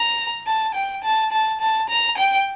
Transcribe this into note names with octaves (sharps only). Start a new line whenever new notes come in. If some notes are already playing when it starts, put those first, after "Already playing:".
Already playing: A#5
A5
G5
A5
A5
A5
A#5
G5